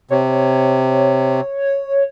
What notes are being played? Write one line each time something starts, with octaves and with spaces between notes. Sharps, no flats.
C3 C#5